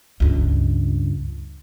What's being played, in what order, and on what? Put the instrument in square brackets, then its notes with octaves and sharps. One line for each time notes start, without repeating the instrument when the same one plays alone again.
[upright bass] C#2 G2